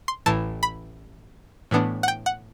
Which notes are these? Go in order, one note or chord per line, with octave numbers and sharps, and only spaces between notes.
C6
A1 A2 E3 A5
B5
A2 E3 B3 D4
F#5
G5
F#5